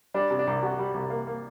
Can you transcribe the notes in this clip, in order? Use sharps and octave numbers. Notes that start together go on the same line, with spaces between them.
G3 D4
C3
D4
C2
C3 F#4
G3
C2
A#3
A#3